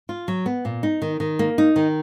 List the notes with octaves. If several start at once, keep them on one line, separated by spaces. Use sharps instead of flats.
F4
F#3
B3
A#2
D#4
D#3
D#3
A#3
D#4
D#3